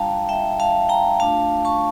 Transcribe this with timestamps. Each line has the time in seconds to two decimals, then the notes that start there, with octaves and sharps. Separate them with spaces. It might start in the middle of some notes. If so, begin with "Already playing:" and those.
Already playing: G3 D4 F4 F5 G5 A5 A#5
0.29 E5 G5
0.60 F5 A5
0.89 G5 A#5
1.20 A3 D4 F4 F5 A5
1.65 A5 C#6